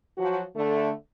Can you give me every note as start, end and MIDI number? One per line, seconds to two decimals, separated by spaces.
0.17 0.41 53
0.17 0.41 54
0.17 0.41 66
0.55 0.90 50
0.55 0.90 57